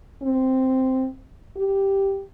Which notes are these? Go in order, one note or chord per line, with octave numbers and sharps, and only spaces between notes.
C4
G4